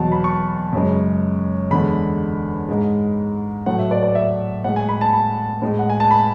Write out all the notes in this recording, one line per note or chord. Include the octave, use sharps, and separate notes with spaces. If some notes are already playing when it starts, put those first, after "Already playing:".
Already playing: E2 B2 F#3 A5
B5
C#6
F#2 C#3 G#3
E2 D3 G#3 B5
G#2 G#3
A2 F#3 A3 F#5
E5
D5
D5
E5
A2 G#3 F#5
G#5
B5
A5
B5
A2 G#3
F#5
G#5
A5
B5